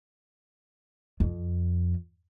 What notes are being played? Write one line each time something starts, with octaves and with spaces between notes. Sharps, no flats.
F2